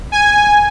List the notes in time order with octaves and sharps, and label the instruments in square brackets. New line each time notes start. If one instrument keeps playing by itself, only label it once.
[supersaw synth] G#5